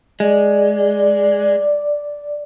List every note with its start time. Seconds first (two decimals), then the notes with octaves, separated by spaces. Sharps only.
0.20 G#3 D5